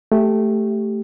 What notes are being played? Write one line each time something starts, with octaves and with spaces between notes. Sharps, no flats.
A3 G4